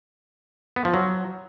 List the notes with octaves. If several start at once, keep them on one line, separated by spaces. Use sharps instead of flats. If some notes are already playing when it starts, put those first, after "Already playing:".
B3
F3
F#3